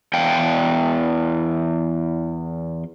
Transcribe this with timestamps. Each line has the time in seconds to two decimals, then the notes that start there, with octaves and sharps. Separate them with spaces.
0.14 E2 F5 G5